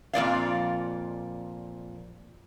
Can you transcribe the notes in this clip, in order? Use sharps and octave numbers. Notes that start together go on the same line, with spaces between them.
F2 A#2 D5 F5